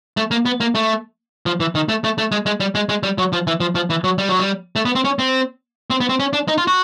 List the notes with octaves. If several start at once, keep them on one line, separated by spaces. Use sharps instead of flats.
A3
A#3
B3
A#3
A3
F3
E3
D#3
A3
A3
A3
G#3
G#3
G3
G#3
G#3
G3
F#3
F3
E3
F3
F3
E3
F#3
G3
F#3
G3
A3
B3
C4
C#4
C4
C4
B3
C4
C#4
D4
D#4
F4
F#4